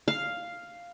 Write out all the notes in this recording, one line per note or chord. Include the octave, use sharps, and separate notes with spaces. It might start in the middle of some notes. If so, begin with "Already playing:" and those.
F5